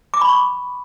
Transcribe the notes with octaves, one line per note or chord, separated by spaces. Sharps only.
D6
B5
C#6